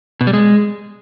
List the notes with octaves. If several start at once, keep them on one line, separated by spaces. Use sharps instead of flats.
B2
G3
G#3